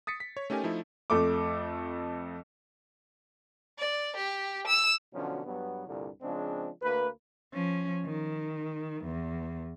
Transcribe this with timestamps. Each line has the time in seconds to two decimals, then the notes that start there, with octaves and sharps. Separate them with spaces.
0.07 D#6 A6 B6 C#7
0.20 B6
0.37 C#5
0.50 A3 C#4 D#4 G4 A#4 G#5
0.64 F3 A3 D#4 E4
1.10 F2 A3 D6
3.79 D5
4.16 G4
4.67 E6
5.14 B2 D3 F3 F#3 C#4
5.45 G2 F#3 B3
5.86 C2 G2 A#2 D3
6.21 C#3 F3 G#3 C4 D4
6.82 D2 A#3 B4
7.53 F3 C#4
8.06 D#3
9.04 E2